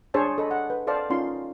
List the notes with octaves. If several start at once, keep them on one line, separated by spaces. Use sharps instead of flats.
D4 G#4 C5 C#5 A5 C#6
A4 D#5 B5
F#5
B4
A4 C5 D5 F5 A5
C#4 D#4 F4 C6